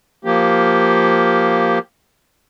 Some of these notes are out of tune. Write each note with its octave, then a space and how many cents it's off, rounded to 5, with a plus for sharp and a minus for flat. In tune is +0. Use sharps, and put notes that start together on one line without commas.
F3 +0 A#3 +0 G4 +0